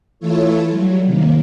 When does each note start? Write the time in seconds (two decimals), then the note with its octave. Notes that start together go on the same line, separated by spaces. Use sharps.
0.19 E3 A3 E4 F4 A4 C#5
0.70 F#3 G3
1.06 C3 D#3 A#3